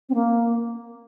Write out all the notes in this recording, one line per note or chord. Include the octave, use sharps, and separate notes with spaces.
C4
A#3